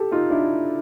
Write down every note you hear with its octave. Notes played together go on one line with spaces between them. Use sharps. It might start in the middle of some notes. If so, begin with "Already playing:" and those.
Already playing: G4 A4
D#4 F4
D4 E4